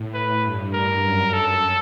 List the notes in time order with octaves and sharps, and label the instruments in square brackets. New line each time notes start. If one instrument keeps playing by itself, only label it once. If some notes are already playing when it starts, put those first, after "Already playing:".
Already playing: [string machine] A2
[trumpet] B4
[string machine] G2
[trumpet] A#4
[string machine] F#2
[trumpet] A4